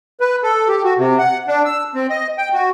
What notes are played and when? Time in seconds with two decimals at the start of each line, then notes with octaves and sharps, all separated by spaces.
0.20 B4
0.43 A4
0.68 G4
0.84 F#4
0.98 C3
1.19 F#5
1.48 D4
1.65 E6
1.94 C4
2.10 D#5
2.38 G5
2.54 F#4